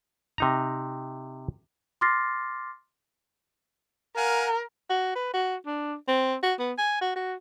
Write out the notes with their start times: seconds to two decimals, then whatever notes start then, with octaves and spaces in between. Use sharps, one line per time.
0.38 C3 D#4 A#5
2.01 C6 D6 F6 A6 A#6 C7
4.17 A#4 F5 F#5 G#5
4.90 F#4
5.16 B4
5.34 F#4
5.66 D4
6.08 C4
6.43 F#4
6.59 B3
6.78 G#5
7.01 F#4
7.16 F#4